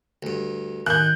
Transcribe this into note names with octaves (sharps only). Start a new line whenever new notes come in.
D2 G2
D#3 F#6 G6